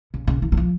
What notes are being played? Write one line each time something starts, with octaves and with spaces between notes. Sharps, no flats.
C#3
C#3
E3
F#3
F3